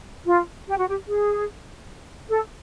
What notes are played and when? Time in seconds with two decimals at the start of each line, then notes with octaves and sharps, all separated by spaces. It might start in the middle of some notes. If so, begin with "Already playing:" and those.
0.25 F4
0.66 G4
0.77 F#4
0.88 G4
1.06 G#4
2.28 A4